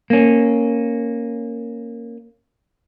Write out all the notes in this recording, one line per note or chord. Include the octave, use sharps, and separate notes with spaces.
A#3 C#4